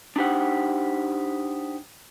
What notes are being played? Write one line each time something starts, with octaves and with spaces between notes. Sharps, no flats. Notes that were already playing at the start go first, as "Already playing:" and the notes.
D4 D#4 G4 C5 F#5